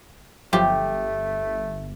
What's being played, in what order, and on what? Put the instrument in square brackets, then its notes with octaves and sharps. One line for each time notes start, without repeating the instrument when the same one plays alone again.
[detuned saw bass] G1 [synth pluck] F3 F#3 [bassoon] A3 [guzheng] G4